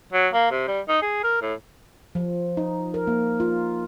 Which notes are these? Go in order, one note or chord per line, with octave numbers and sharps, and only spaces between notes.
F#3
A#3
C3
G3
D#4
G#4
A#4
A2
F3
D#4
A#4
A#3
F4